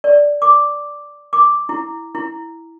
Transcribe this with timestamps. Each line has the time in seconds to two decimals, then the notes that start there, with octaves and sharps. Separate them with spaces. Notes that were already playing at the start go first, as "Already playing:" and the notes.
0.04 D5
0.42 D6
1.33 D6
1.69 E4
2.15 E4